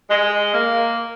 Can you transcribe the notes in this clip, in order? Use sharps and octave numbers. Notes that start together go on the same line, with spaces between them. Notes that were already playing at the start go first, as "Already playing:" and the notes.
G#3
A#3